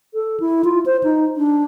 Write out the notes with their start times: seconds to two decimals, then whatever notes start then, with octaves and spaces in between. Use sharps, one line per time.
0.14 A4
0.40 E4
0.64 F4
0.86 C5
1.03 D#4
1.37 D4